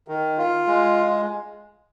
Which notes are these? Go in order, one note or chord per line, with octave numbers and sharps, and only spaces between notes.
D#3
F4
G#3